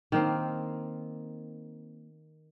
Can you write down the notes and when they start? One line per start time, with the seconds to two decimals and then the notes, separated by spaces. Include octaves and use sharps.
0.12 D#3 A#3 C4